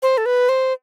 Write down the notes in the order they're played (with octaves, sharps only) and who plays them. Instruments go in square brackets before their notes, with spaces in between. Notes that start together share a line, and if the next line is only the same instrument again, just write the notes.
[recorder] C5
A4
B4
C5